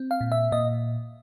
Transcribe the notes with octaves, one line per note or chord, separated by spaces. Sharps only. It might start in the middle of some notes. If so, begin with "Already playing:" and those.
Already playing: C4
F5
A#2
E5
A#2 D#5